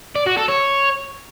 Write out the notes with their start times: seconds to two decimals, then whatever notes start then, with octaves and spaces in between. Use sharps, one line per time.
0.15 D5
0.26 F#4
0.37 A4
0.48 C#5